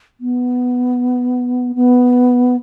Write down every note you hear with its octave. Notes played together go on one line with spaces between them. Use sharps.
B3
B3